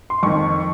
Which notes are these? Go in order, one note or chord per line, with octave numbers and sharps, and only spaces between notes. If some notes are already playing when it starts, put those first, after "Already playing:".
C6
F2 D#3 C#6